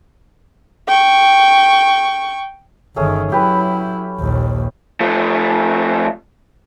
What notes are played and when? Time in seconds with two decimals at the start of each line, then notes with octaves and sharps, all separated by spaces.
0.87 G5 C#6
2.96 G1 D#3 A3 C#4 G#4
3.32 F#3 E4 G4 B4
4.19 A#1 D#2
5.01 F3 A3